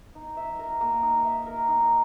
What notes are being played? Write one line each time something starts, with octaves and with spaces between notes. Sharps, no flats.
D#4
E5
A#4
A#3
D#4
E5
A#4
D#4